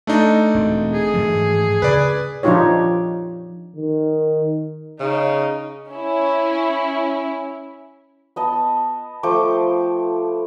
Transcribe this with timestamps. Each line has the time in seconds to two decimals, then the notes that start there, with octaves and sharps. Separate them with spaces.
0.07 A3 D4 D#4
0.55 E1 C4
0.93 G#4
1.14 G#2 E3 F3
1.82 D2 C#3 B4 D5
2.43 F3 D4 D#4 F4 G4 C#5
3.76 D#3
5.00 C#3 D#4
5.90 C#4 E4
8.36 B3 D#5 A5
9.23 F3 A3 G5 D6